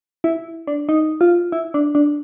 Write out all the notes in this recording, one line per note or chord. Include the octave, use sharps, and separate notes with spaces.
E4
D4
D#4
F4
E4
D4
D4